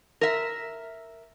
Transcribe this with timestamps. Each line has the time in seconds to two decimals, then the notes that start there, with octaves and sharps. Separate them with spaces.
0.21 A#4 E5